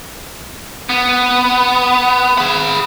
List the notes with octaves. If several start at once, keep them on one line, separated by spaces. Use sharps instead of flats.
B3
G#4 B5